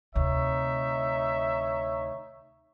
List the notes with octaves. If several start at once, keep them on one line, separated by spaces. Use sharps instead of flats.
D2 C3 D#4 C#5 E5